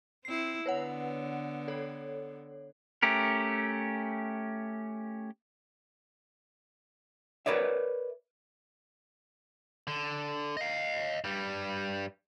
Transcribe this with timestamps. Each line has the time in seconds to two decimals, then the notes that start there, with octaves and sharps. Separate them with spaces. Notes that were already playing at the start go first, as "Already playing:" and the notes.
0.25 C4 E4 C7
0.66 D3 B3 B4 C#5 F#5
1.68 A4 C#5
3.03 A3 C#4 G4 A#4
7.46 A#4 B4 C#5 D5 E5
9.87 D3
10.57 D#5 F5
11.24 G2 G3